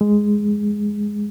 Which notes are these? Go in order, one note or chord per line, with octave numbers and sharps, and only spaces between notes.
G#3